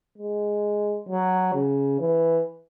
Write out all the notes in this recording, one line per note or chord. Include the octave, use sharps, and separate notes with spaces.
G#3
F#3
C#3
E3